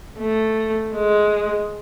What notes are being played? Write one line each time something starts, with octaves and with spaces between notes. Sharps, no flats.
A3
G#3